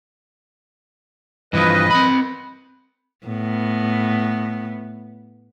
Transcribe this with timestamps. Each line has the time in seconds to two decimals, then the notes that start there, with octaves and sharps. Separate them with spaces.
1.53 G2 E3 F3 B4 D#5
1.91 C4 B5
3.26 A2 B3